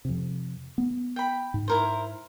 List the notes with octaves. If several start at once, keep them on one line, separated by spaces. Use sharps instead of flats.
F2 C3
B3
G5 B5
G#2
E4 A#4 C5